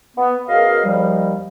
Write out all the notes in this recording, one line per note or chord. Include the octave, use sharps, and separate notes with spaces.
B3
F#2 B2 G#4 A#4 D#5 F5
D#2 F3 G3